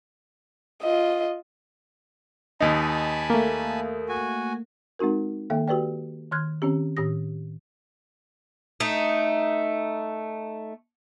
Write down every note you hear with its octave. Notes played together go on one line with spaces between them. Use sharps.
F4 D#5
D#2 D#4 G#5 A5 B5
A3 A#3
F#4 G#5
G#3 C4 D#4 F#4 A#4
D#3 A#3 A4 E5 F5 G5
F#4 G4 B4 D5 G5
D#3 C6 F6 F#6 G#6
D#3 C4 C#4 G4
A2 D#3 G4 D#6 A#6
A3 D#4